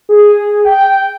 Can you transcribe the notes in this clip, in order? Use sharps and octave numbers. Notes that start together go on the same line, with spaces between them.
G#4
G5